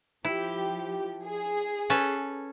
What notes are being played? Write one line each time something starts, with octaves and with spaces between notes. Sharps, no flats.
F3 E4 G4
G#4
C#4 A4 B4